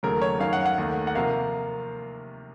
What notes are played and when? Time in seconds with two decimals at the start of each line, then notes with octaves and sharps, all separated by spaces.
0.03 D#2 C#3 F#3 A3 A#4
0.22 C#5
0.40 F#2 D#3 F#3 F5
0.53 F#5
0.66 F#5
0.78 D#2 D#3 A3
1.07 F#5
1.15 C3 F3 A#3 F5